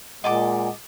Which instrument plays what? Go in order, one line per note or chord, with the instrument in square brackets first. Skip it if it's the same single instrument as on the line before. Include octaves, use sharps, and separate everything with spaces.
[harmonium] A#2 [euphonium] G#3 [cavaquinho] D#5 A5 D6 [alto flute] F#5